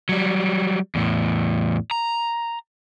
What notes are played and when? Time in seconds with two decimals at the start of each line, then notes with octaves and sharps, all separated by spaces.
0.09 F#3 G3
0.95 E2 A2
1.91 A#5